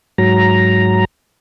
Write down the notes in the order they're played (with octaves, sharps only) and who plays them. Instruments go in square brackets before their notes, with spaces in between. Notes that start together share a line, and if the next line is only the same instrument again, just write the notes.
[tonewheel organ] G#2 F#3 A#5